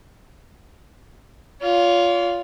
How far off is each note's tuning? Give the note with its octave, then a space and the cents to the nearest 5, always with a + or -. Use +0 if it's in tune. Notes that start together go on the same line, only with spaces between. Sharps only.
F4 +0 C#5 +45